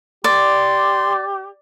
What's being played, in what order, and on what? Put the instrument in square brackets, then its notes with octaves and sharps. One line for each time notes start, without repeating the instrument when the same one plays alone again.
[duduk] G4 [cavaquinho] D5 [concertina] C6